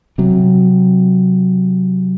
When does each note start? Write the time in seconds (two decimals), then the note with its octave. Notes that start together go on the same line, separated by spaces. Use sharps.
0.18 C3 F#3